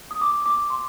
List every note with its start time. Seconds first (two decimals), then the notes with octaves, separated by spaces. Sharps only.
0.11 D#6
0.21 D6
0.46 D6
0.70 C6